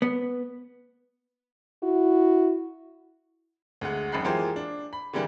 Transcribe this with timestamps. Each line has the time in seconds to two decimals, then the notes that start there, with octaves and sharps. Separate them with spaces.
0.02 B3
1.83 E4 F#4
3.81 D2 D3 G#3 F#5
4.12 G#1 F#2 D#3 F#5 B5 C7
4.25 E3 G#3 A#3 F4 G4 C5
4.56 D4
4.93 B5
5.13 D3 E3 G3 A#3 D4